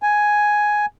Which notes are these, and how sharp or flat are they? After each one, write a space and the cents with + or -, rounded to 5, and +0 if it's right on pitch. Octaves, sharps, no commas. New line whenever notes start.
G#5 +5